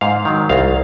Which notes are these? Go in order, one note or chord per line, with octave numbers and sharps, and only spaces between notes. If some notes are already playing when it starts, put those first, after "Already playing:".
G#2 F5
D#3 F#3
C2 F5